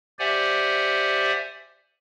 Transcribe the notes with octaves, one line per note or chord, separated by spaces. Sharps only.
G4 C5 D5 E5 F#5 G#5